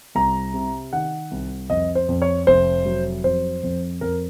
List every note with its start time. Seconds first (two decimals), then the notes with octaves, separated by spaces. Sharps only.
0.15 C2 A#5
0.54 C3
0.93 D#3 F#5
1.31 C2
1.70 F2 D#5
1.95 C5
2.09 F2
2.22 C#5
2.47 F1 C5
2.85 F#3
3.24 F2 C5
3.63 F2
4.01 F2 A#4